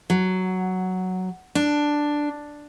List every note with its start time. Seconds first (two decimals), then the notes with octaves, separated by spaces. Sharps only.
0.10 F#3
1.55 D4